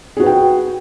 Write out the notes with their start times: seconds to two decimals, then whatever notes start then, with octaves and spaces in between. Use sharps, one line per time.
0.17 G#4
0.20 F#4
0.23 B4
0.26 G5